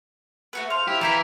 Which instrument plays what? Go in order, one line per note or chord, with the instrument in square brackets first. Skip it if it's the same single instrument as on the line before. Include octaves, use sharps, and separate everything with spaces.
[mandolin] A3 F#4 B4
[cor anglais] C5 [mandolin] F5 [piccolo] F7
[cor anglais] E4 [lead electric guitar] G4
[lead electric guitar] E3 [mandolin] A#4 G5 B5